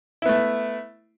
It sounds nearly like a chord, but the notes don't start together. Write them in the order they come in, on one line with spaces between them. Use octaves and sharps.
E4 B3 A3